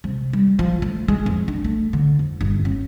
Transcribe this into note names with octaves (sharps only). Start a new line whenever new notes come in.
C3
G3
F3
A3
G#3
F2
D4
A3
D3
F2
G1
C#4